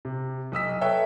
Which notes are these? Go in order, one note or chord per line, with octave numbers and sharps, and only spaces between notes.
C3
B1 D#6 E6 B6
A4 B4 C#5 E5 G5